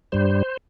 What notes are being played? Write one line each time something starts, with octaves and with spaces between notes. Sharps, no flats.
G2 G3 C5